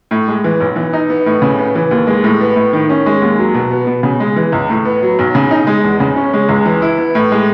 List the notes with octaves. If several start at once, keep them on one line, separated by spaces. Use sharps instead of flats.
A2
G#3
E3
B1
E3
D#4
B3
A2
C#3
B3
E3
D#2
G#3
A2
B3
A2
D#3
C#4
G#3
D#2
F#3
B2
B3
B2
C#3
G#3
E3
C#2
A2
B3
F#3
B1
C#3
D#4
G#3
E2
C#3
C#4
G#3
C#2
E3
E4
B3
A2
G#3